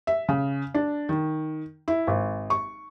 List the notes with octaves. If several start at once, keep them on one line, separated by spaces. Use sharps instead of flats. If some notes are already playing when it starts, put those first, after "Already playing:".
E5
C#3
D4
D#3
E4
G#1
C#6